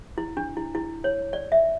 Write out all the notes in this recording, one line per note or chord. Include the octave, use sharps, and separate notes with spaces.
E4
D4
E4
E4
C#5
D5
E5